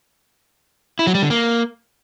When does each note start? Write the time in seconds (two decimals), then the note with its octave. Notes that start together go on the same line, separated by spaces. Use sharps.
0.99 E4
1.07 F#3
1.15 G3
1.22 D3
1.30 A#3